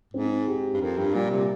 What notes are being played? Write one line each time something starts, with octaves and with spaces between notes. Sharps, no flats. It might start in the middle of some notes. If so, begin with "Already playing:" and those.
G#2 C4
G4
G2
F2 A#4
G2
A#2 G3
C3